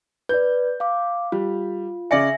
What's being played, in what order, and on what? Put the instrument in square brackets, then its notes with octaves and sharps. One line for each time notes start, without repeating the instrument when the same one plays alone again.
[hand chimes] B4 D5 [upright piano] G6
[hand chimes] F5 D6
[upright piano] G3 [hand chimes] F4
[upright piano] C#3 D5 C#7 [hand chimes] E5 G#5 A#6